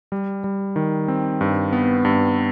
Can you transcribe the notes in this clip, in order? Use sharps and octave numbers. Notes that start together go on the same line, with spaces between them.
G3
G3
D#3
C4
G2
B3
G2